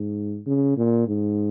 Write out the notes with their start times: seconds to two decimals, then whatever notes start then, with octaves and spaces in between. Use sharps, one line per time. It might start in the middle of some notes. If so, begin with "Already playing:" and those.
Already playing: G#2
0.47 C#3
0.77 A#2
1.08 G#2